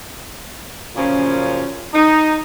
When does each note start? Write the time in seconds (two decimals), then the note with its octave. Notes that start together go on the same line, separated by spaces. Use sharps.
0.95 F#2 A#2 C#3 F3 C#4
1.93 D#4